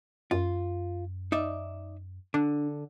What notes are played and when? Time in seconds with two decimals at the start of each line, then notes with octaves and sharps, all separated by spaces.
0.31 F#2 F4
1.32 D#4 D5 E5
2.34 D3 D4